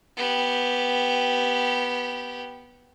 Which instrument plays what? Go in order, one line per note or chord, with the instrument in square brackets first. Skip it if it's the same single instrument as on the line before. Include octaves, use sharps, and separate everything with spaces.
[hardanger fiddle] B3 G4